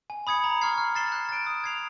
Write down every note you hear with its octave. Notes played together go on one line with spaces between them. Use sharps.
G#5
B5 D#6 G#6 C#7
A#5
C#6 F6 G#6 C7
F6
A6 C7 E7 G7
F#6
A6 D7
D#6
G#6 C7 F7